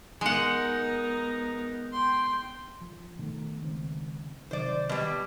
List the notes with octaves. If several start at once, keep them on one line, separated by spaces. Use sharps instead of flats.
G#3 B3 D#4 A#4 F#5
G5 C6
F3
B2 D#3 A3
C#2 D#3 C4
C3 D#3 F#3 C5 D5
B2 G3